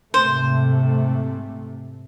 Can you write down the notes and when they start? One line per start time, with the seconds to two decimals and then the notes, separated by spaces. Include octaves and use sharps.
0.14 G#2 C3 A3 C5